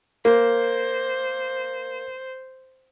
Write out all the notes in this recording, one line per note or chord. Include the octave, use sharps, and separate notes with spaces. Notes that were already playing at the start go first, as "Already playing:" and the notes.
A#3 C5